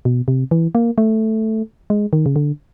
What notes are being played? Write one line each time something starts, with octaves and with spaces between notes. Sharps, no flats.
B2
C3
E3
A#3
A3
G#3
D#3
C#3
D3